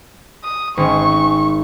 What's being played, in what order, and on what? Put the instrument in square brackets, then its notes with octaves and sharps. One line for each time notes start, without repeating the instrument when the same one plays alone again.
[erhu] D#6
[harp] G#1 C#4 [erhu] C#6